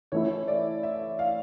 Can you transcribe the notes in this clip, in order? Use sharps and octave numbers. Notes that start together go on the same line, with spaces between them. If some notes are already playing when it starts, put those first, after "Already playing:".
E3 A3 E4 C#5
D5
E5
F5